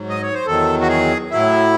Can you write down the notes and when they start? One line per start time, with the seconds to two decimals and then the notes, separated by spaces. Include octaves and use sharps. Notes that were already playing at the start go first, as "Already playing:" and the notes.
Already playing: G#2 F#3
0.09 D#5
0.22 C#5
0.34 C5
0.46 E2 D#3 F#3 A4
0.81 F#4
0.88 G#4
1.30 A2 F#3 E4